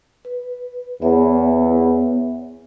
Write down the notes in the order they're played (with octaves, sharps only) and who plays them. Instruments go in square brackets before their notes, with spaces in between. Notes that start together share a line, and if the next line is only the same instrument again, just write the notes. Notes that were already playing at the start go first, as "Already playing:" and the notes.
[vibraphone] B4
[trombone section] E2 [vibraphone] B3 C#5 E5